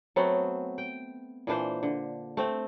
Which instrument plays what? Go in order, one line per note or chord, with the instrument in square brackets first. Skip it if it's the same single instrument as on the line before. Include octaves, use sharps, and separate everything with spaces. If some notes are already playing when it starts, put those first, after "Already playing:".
[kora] F#3 A3 B3 C4
G5
A#2 E3 D4 C5
D3
A3 C4